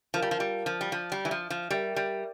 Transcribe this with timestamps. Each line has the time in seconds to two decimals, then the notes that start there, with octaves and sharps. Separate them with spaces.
0.14 F3 F4 A#4 F5 A5
0.22 G3
0.31 F3
0.40 G3
0.66 F3
0.81 G3
0.92 F3
1.12 G3
1.25 E3
1.31 F3
1.50 F3
1.70 G3 G4 A#4 E5 G5
1.96 G3